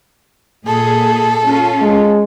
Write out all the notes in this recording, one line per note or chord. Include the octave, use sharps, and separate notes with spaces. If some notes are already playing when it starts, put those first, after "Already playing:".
A#2 G#4 A4
C#4 F4
G#3